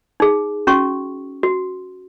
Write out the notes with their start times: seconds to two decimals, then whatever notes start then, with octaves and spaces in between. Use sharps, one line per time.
0.20 D#4 G#4
0.67 C#4 F#4 C#6
1.43 F#4